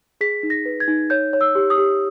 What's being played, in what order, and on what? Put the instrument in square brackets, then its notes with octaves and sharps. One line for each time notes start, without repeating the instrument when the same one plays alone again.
[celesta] G#4 B6
D#4
A#6
B4
G#6
D#4
C#5 G6
C#5
E6
G4
D#6
G4